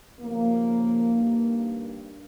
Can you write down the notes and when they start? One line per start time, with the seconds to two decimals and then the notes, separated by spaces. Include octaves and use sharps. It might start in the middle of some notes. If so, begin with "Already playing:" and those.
0.19 D#2 C#3 F3 A#3
1.12 G2 D#3